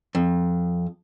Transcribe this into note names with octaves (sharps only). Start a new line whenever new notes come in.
F2